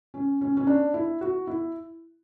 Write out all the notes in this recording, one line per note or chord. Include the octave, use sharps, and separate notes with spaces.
C#4
C#4
C#4
D4
E4
F#4
E4